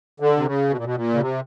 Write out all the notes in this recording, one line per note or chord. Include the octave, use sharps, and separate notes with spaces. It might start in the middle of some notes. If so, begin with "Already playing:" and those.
D3
C3
C#3
B2
A#2
B2
A#2
C#3
C3